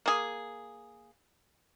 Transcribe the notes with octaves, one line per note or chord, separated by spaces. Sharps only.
A#3 G#4